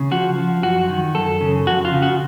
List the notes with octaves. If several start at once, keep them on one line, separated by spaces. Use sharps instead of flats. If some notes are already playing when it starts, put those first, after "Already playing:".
Already playing: C#3
F3 F#4
F3
F#2 F#4
D#3
F#2 A4
C#3
F2 F#4
F4
C#3
F#4